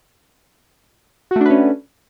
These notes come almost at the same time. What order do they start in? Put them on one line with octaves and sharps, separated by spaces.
F#4 A3 D4 B4 C#4